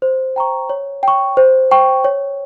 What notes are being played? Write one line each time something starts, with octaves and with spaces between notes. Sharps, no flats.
C5
G5 A#5 C#6
C#5
G5 C#6
C5
G5 C#6
C#5